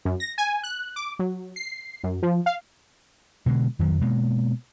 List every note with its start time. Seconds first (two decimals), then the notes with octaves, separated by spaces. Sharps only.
0.05 F#2
0.20 A#6
0.38 G#5
0.63 F#6
0.96 D6
1.19 F#3
1.56 C7
2.04 F#2
2.22 F3
2.46 F5
3.46 B2 D3 G#3
3.79 F2 D#3 F3 F#3
4.01 B2 G#3 A#3